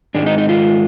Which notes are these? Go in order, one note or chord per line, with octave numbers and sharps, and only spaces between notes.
G#2 D#3 G#3 D4
D#4
D#4
F4